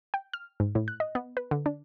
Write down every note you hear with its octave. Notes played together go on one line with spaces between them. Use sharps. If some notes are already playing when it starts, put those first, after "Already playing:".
G5
F6
G#2
A2
F#6
D#5
B3
B4
D3
D4